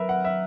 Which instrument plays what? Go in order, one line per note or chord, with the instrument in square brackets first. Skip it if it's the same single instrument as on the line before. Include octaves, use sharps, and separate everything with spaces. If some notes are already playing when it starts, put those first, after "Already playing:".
Already playing: [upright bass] F#3 [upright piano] A#4 B4 E5
[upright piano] F#5
E5